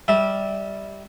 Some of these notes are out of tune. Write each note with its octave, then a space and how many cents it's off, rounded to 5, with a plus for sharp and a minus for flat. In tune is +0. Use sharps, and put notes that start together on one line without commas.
G3 +0 E5 -20